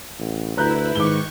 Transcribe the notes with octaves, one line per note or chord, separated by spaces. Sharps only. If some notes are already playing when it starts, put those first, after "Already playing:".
A1
D2 E4 B4 A#5 F#6 G6
G#2 D#3 C#6 D6 G7